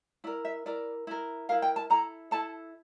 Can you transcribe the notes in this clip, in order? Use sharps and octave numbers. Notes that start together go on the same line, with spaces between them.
E4 A#4 D5
E5
E4 A#4 D5
E4 A#4
E4 A#4 F5
G5
A5
E4 A4 A#5
E4 A4 A5